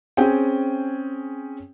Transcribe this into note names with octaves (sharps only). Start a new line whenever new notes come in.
C4 C#4 G#4 G5